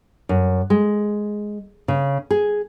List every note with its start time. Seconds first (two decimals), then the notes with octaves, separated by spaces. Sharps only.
0.29 F#2
0.70 G#3
1.88 C#3
2.31 G#4